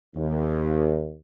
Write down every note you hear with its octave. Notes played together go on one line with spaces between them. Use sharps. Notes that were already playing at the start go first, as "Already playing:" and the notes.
D#2